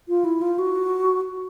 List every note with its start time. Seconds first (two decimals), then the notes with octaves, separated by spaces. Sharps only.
0.08 F4
0.24 E4
0.42 F4
0.59 F#4